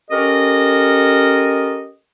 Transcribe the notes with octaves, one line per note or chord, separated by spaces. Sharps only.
C#4 G4 A4 A#4 D#5